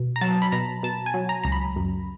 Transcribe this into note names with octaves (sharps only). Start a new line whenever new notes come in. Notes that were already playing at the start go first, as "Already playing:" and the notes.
Already playing: B2
A#5
F#3 A5
B5
B2 A#5
B2 A5
G#5
F#3
A#5
C#2 A#5
B5
F#2